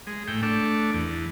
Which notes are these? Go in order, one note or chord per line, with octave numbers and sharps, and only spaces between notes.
G#3
A2 G5
A3 D4
E2